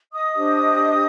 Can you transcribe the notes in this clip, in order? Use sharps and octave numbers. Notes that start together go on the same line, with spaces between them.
D#5 D#6
D4 G4 C5